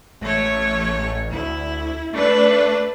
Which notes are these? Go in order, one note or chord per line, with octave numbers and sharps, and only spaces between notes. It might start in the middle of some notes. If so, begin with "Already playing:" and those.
A1 A3 C#5
D2 E4
A3 D4 B4